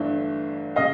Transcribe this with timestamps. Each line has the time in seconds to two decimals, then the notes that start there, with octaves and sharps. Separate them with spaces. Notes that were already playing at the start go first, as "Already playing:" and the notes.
Already playing: G1 G2 E3 A3
0.76 C#3 D#5 F5